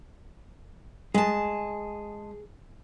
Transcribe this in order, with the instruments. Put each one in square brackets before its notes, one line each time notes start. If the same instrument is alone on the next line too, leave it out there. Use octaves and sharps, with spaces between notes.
[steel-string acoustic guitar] G#3 A5 [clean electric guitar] G#4